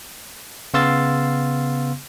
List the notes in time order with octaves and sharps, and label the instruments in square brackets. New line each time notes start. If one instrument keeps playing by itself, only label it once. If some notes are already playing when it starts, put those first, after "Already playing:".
[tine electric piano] C#3 B3 F5 C6 E6 A6